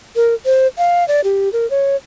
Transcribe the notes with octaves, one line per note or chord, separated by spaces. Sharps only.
A#4
C5
F5
D5
G4
A#4
C#5